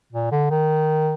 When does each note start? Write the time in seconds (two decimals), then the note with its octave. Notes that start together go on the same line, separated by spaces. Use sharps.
0.12 A#2
0.32 D3
0.50 D#3